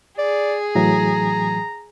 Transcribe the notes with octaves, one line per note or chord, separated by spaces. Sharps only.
G#4 D5
A2 E3 F#3 A#5